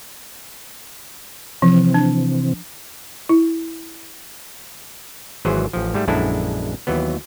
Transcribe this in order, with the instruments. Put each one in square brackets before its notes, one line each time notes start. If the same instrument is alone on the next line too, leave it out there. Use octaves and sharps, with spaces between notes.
[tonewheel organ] C3 E3 C4 [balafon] F3
[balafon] D4
E4
[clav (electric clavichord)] G#1 E3 F#3 G#4 C5
A1 F3
G#2 G3 A3
A#1 F#2 G#3 D4 E4 A4
D#2 E3 F#3 B3